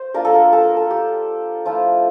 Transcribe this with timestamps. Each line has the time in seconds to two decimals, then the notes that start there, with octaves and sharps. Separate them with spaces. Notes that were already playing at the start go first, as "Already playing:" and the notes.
Already playing: C5
0.14 A#3 D4 F4 A#4
0.25 A4
0.34 A#4
0.53 A4
0.65 A#4
0.76 A4
0.90 G4
1.65 F3 A3 E4 F4